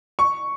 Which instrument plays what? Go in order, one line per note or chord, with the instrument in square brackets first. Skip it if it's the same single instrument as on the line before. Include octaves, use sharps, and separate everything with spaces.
[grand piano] C#6